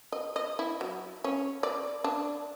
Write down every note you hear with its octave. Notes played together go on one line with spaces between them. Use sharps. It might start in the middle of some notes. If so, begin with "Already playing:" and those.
D#5
D#5
E4
F#3
C#4
D5
D4